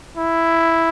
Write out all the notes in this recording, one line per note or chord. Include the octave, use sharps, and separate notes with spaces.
E4